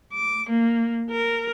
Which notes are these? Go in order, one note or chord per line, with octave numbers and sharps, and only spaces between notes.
D6
A#3
A#4